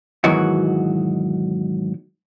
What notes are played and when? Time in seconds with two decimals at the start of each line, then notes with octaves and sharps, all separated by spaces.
0.24 G#2 B2 D#3 E3 F#3 F#4